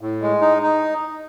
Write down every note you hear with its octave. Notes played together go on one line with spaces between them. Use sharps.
A2
G#3
D#4
D#4